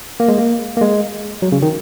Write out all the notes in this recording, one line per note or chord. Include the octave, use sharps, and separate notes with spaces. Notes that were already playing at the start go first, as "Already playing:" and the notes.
A#3
G#3
A#3
A#3
G#3
F#3
C#3
D#3